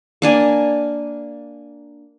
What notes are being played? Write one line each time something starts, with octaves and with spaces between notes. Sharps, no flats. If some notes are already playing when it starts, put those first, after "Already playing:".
A#3 D4 G#5